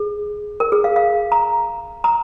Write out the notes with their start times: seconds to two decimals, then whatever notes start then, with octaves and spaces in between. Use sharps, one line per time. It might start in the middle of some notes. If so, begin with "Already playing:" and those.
Already playing: G#4
0.60 A#4
0.72 G#4
0.84 F5
0.96 F5
1.32 A#5
2.04 A#5